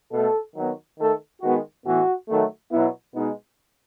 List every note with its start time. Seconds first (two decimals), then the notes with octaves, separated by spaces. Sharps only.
0.12 B2 A3 A4
0.55 D#3 F#3 B3
0.98 D#3 A3 A4
1.41 D#3 G#3 B3 F#4
1.85 A2 E3 B3 F#4
2.28 D#3 F#3 A3
2.72 B2 F#3 B3 E4
3.15 B2 G#3 B3 D#4